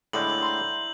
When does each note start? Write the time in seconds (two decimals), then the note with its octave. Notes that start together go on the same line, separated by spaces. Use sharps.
0.13 A2 D3 G#3 E4 D5 G6 F#7
0.41 A#5 C6